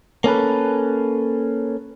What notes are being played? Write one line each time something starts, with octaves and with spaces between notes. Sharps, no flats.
A#3 C#4 A4 B4